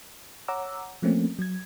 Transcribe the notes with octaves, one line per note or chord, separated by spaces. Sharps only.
C#5 F#5 A#5 D6 E6
F3 A3 A#3 C4 C#4
F#3 G#6